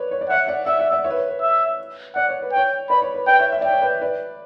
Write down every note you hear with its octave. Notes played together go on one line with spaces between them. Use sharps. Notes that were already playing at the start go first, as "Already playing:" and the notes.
Already playing: B4 C#5 D5
C#5
D5
C#5 E5 F#5
D5 F#5
D5 E5 F#5
D5 F#5
D5 F#5
C#5 E5
B4
C#5
B4
E5
D5 F#5
C#5
B4
C#5 G5
B4 D5 B5
C#5
B4
B4 D5 G5
C#5 E5
E5
D5 G5
C#5
B4 D5
B4 D5